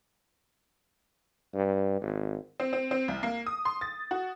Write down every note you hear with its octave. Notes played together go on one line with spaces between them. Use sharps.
G2
G#1
C4
C4
C4
C2
A#3
D#6
C6
A6
F#4